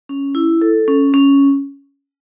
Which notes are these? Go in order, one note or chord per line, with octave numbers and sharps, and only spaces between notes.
C#4
E4
A4
C#4
C#4